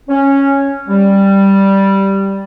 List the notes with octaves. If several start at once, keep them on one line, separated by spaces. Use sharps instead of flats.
C#4
G3